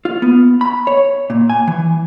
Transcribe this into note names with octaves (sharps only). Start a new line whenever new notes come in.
F4
B3
B5
C#5
A#2
G#5
E3